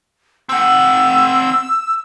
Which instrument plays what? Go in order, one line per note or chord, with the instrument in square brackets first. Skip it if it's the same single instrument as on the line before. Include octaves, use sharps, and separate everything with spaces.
[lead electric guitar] C4 F#5 [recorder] E6